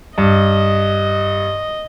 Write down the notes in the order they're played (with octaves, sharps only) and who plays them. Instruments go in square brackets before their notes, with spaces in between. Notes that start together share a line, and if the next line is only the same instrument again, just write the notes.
[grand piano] G2 [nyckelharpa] D#5